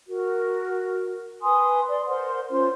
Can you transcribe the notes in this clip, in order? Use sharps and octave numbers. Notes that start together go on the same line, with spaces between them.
F#4 A#4
B4 G#5 C6 D#6
D5 C6
A#4 C5 F#5 C6
C#4 F4 C5 C6